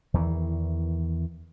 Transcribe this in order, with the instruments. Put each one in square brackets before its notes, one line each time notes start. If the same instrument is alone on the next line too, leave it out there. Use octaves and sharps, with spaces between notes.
[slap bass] E2 D#3 E3